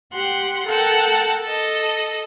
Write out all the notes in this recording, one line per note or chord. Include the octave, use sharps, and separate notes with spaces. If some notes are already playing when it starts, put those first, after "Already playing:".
G4 F#5 C6
A4 A#4 F#5 G5 A5
A4 D#5